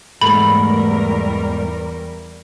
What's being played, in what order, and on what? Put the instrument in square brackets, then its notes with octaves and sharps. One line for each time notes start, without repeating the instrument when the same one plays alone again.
[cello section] E2 G3 A#4 [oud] G#2 A3 [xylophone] B5